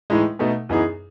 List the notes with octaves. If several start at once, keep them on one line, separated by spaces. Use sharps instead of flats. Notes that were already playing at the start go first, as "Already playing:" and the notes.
A2 E3 G#3 D#4
B2 A3 D#4
F#2 E3 B3 D#4 G#4